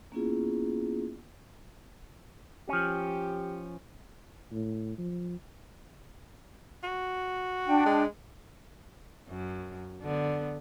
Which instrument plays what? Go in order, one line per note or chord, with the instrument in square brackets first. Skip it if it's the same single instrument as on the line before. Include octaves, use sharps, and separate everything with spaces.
[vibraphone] A#3 B3 C#4 E4 F4 G#4
[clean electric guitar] F3 C#4 [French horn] G4
[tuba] A2
F3
[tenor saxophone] F#4
[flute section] D4 G5
[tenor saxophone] G#3
[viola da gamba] F#2
D3 B3